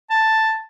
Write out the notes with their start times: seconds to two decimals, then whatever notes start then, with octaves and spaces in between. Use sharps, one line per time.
0.10 A5